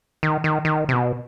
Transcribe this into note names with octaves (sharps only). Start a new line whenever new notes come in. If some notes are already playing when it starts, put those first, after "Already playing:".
D#3
D#3
D#3
C3
B2